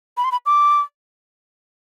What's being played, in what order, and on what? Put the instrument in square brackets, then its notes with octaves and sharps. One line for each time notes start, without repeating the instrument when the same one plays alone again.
[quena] B5
C6
B5
D6